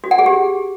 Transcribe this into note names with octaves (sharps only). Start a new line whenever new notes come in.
F#4
F#5
G#4
G4